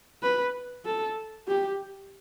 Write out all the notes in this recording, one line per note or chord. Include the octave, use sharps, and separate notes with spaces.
B4
A4
G4